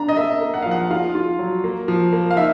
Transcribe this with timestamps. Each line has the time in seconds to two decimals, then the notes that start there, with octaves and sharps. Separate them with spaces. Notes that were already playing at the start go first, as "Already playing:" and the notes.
Already playing: D4 A#5
0.09 D#5
0.17 A#3 E5
0.41 A#3
0.54 F#5
0.62 F3 F5
0.71 F#5
0.91 F4 F5
1.15 F4
1.39 F#3
1.64 A#3
1.88 F3
2.13 A#3
2.31 F5
2.37 D#4 E5